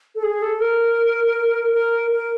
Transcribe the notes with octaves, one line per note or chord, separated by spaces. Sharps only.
A4
G#4
A4
A#4
A#4
A#4